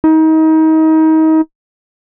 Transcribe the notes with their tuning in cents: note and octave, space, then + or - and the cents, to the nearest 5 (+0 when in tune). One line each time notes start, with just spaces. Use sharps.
D#4 +30